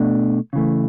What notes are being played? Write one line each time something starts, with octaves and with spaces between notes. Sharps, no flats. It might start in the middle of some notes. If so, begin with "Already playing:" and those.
Already playing: B2 A3 D4
C#3 E3 A3